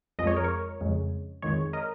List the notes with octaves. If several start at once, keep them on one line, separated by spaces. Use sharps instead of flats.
F2 F3 G#3 D#5
C#5
A#4
C#5
F2 C#3 G#3
F2 D#3 G#3 C#5
A#4 D#5